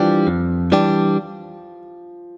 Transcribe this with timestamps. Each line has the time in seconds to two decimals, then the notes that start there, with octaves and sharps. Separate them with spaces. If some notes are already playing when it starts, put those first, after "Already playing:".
Already playing: E3 F3 G3 D4 G4
0.27 F2
0.72 E3 G3 D4 G4